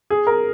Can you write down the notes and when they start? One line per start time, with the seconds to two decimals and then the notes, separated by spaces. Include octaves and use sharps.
0.10 G#4
0.27 A#4